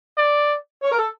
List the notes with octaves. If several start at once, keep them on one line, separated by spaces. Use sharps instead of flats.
D5
C#5
A#4
A4